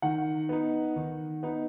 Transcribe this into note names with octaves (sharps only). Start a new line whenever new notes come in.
D#3 F#5
B3 D#4
D#3
B3 D#4